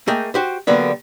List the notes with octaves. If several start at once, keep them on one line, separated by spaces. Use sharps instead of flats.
A3 A#3 G#4 D#5 G5
F#4 G4 C5
D3 F#3 G3 A#3 B3 D4